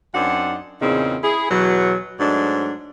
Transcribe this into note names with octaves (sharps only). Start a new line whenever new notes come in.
F#2 C4 D4 D#4 F#5
E2 A#2 C#3 C4 D#4
E4 G#4
E2 B2 F#3
G#2 F#3 A3 D4